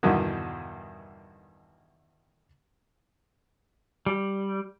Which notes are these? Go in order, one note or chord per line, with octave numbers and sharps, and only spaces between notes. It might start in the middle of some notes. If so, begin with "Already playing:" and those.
E2 G2 B2 D3 D#3
G3